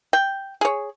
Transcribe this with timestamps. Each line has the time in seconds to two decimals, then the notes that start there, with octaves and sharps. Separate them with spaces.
0.13 G5
0.61 G#4 C#5